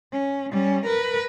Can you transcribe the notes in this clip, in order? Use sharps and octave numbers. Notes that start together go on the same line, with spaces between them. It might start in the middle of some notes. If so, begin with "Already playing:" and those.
C#4
G3 C#4
A#4 B4